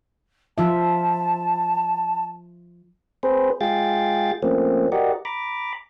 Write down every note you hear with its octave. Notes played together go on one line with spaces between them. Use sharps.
F3 F4 E5 A5
C4 G#4 B4 C5
G#3 F4 G#4 F5 G5 A6
F3 A3 A#3 C4 C#4
F#4 G4 A#4 D5 D#5 F#5
A#5 B5 D6